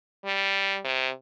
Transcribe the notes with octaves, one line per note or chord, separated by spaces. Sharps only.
G3
C3